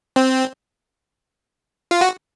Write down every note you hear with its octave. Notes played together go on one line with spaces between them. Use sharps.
C4
F4
F#4